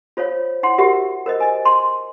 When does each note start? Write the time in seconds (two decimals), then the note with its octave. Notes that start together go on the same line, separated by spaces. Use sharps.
0.17 F4 C5 C#5 F5
0.63 E4 F#5 C6
0.78 F#4 G4 A#4 E5 F#5
1.26 A#4 C5 D#5
1.40 D#5 G#5
1.65 C6